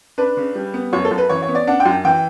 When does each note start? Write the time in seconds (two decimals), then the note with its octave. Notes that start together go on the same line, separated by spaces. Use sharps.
0.18 D4 B4
0.37 C#3
0.55 G3
0.74 B3
0.93 F#2 C#5
1.05 A4
1.11 F#2
1.18 B4
1.29 E3 C#5
1.42 C#5
1.48 B3
1.55 D5
1.67 D4 F#5
1.80 G5
1.86 F#2
2.05 E3 G5